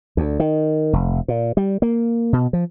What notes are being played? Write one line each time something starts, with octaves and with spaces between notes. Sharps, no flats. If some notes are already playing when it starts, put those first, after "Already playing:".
D2
D#3
F1
A#2
G3
A#3
B2
F3